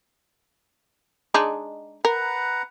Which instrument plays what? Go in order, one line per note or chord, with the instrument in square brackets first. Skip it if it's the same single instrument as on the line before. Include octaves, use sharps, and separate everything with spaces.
[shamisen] G#3 D4 D#4
[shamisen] A#4 [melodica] B4 F#5 A#5